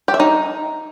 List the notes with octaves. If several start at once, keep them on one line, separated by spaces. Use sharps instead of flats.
G4
E5
D#4